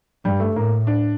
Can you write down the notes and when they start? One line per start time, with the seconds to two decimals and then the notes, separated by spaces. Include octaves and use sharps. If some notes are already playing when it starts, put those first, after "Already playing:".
0.25 G2 G3
0.40 A3
0.56 A2 A#3
0.87 D4